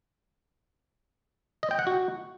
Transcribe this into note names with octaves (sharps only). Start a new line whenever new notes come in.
D#5
G5
F#5
F#4